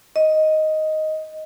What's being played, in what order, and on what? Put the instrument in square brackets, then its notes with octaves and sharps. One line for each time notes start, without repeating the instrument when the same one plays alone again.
[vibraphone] D#5